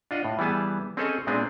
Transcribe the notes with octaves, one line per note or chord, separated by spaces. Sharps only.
D4 F4 D#5 F#5
A2
E3 G3 B3 G#4 A5
C4 C#4 G#4 A4 C#5 D#5
A#2 G#3 B3 C4 D4 G#4